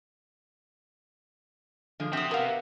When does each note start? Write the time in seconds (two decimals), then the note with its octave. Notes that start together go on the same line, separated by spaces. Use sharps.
2.00 D3 F3 G#3
2.13 C4 F#4 G4 E5 G5 D#6
2.31 B3 A#4 F5